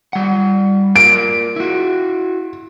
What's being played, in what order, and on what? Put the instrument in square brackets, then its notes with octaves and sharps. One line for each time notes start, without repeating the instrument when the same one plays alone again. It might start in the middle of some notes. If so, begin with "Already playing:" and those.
[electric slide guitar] G3 F#5
[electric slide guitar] F4 A#4 [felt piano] D7
[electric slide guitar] E4 F#4